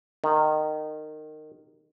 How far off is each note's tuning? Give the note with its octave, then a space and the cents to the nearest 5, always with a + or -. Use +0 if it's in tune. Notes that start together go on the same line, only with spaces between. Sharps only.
D#3 -20